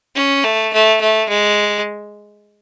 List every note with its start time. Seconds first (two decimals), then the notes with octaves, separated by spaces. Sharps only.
0.15 C#4
0.44 A3
0.73 A3
1.01 A3
1.29 G#3